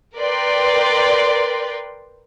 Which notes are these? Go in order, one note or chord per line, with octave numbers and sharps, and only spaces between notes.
A#4 B4 D5 G5 C6